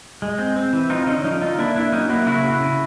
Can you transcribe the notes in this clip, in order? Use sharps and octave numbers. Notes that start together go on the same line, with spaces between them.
G#3
C4
C4
E3
C4 D#4 F4
D3 C#4 D#4
F3 C#4 D#4
D3 D#4 F4
A#3 D4 E4
A#3 D4 E4
F#3 C#4 D#4
A#3 E4 F#4
C#3 E4 F#4
C#3
C#3